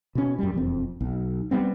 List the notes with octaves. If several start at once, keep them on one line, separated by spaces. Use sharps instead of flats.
B2 C#4
F#2 G3
E1 F2 C4
B1
G3 B3 C4